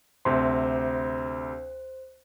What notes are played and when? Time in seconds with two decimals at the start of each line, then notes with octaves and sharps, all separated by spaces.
0.25 D2 C3 C5 C6